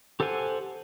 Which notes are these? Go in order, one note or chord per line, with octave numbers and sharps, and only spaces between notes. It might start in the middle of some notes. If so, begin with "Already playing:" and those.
G4 A4 C5 F#5 G#5